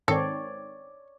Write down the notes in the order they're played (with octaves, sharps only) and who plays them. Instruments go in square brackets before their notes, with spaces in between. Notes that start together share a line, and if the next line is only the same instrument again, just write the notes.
[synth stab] G#2 D#3 C4 [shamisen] A4 [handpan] C#5 D5